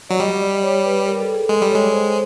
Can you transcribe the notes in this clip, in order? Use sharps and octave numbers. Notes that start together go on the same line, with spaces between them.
F#3 D5
G3 D#5
D5
C#5
B4
A#4
A4
G#4
G#3 A4
G3
C#5
G#3
C5